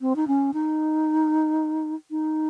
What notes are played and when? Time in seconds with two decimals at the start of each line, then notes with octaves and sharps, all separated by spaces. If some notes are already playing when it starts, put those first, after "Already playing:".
0.01 C4
0.16 D#4
0.27 C#4
0.54 D#4
2.11 D#4